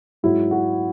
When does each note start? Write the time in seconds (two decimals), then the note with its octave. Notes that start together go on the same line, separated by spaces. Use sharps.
0.23 G#2 F#3 E4
0.51 F#4